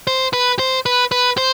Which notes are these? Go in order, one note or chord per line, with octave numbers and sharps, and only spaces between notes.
C5
B4
C5
B4
B4
C5